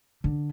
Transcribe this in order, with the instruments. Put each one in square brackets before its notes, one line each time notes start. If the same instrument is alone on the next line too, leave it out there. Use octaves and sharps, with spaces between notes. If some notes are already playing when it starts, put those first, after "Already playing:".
[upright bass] D3